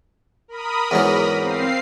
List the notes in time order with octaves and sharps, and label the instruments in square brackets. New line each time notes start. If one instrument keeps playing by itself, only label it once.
[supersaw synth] A#4 B5 D#6
[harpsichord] E2 G#2 F#3
[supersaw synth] C4 F5 C7